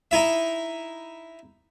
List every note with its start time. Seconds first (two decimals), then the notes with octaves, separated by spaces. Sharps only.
0.11 D#4 E4 E5